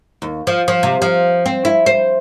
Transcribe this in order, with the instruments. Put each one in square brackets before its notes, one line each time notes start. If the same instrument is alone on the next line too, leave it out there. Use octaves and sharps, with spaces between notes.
[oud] D#2
F3
F3
C3
F3
C4
E4
C5